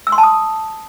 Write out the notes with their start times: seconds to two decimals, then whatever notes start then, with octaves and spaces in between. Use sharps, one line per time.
0.07 E6
0.12 C6
0.18 A5
0.23 D#6